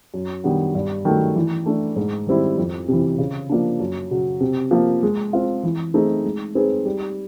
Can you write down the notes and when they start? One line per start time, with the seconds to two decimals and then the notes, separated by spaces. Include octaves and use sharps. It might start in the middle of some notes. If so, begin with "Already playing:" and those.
0.14 F#2
0.44 D#3 G3 B3 D4
0.75 G2
1.05 D#3 F#3 A3
1.36 E3
1.66 A3 D4
1.96 G#2
2.27 D#3 G3 C4 E4
2.58 F2
2.88 C3 E3
3.18 C#3
3.50 F3 A#3 D4
3.80 F#2
4.11 C#3 F#3
4.41 C3
4.71 F3 A#3
5.03 G#3
5.33 C4 F4
5.63 E3
5.94 A3 C4 D#4 G#4
6.24 G#3
6.55 C4 D#4 G#4 B4
6.85 G3